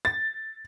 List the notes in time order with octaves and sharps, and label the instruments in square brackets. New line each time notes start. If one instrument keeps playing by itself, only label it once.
[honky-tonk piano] A6